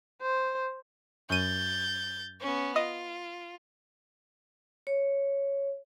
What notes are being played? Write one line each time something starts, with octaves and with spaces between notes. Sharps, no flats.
C5
F#2 G6 A6 D#7
B3 C#4
F4 D#5
C#5